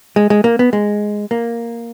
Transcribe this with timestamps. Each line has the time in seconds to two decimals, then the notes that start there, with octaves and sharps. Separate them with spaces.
0.16 G#3
0.30 G#3
0.44 A#3
0.59 B3
0.73 G#3
1.31 A#3